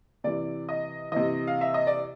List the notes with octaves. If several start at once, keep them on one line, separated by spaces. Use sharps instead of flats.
C3 E3 D5
D#5
C3 E3 D#5
F5
E5
D#5
D5